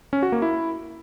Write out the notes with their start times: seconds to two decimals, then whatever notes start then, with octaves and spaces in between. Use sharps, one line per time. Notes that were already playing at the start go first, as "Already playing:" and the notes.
0.13 C#4
0.23 F#4
0.32 A#3
0.42 E4